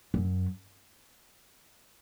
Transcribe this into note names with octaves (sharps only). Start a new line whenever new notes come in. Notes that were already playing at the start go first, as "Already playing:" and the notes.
F#2